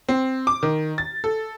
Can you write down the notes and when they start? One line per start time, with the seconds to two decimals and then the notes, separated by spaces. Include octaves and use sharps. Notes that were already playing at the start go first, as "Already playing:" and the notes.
0.09 C4
0.47 D6
0.63 D#3
0.98 A6
1.24 A4